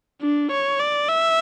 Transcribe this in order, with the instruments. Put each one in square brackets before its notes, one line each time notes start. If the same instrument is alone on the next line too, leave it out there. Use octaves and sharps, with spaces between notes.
[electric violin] D4
C#5
D5
E5